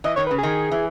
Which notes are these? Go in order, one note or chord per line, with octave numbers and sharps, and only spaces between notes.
E3 D#5
D#3 C#5
B4
C#3
G#4
D#3
E3